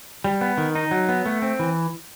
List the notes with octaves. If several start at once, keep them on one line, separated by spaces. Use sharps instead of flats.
G3
B3
D#3
D#4
F#3
B3
A3
C4
E3